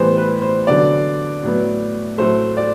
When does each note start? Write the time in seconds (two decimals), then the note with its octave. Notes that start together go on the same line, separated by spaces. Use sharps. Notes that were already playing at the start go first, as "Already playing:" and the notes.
Already playing: A2 E3 G3 B3 C5
0.17 B4
0.42 C5
0.67 D3 F#3 B3 D5
1.43 A2 F#3 B3
2.18 A2 F#3 A3 C5
2.57 D5